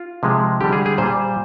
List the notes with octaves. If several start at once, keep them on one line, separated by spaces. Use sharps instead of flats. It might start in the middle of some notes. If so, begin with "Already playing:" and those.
Already playing: F4
C3 F3 G#3
D3 G3 G4
G#4
G#4
A#2 G3 C5